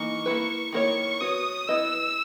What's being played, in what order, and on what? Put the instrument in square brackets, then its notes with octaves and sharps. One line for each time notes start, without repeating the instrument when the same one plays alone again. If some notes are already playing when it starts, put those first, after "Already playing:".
Already playing: [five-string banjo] E3 A#3 D#4 D#5 [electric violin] C#6
[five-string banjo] A#3 E4 B4
[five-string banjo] D#3 A#3 E4 A#4 C#5 [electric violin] C#6
[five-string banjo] B3 F#4 C#5 [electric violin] D#6
[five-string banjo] B3 E4 B4 D#5 [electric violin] E6